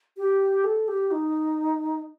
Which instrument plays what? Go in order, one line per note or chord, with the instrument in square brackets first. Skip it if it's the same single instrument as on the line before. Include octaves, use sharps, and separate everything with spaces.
[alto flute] G4
A4
G4
D#4